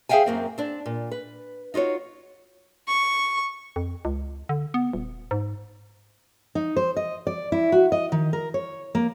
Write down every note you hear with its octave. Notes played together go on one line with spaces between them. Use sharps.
G#4 C5 E5 F5 G5 G#5
F#2 A#3 C4
C4 D4
A#2
B4
D#4 F4 F#4 C#5
C#6
F2
C#2
D3
B3
D#1
G#2
D#4
C5
D#5
D5
E4
F#4
D#5
D#3
A#4
C#5
A#3